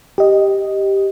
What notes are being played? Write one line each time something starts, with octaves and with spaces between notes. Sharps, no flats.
G4 D#5